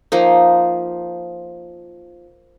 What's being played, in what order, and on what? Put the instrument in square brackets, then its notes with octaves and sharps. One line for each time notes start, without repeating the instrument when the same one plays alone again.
[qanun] F3 A#3 D#4